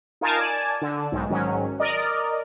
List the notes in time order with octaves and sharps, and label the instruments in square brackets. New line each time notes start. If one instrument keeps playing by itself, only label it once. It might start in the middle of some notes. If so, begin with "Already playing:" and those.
[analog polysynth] D#4 F4 A#4 G#5 A5
D5 G#5 A5
D3
B1 G#2
G#2 D#3 F#3 C#4
A#4 D5 D#5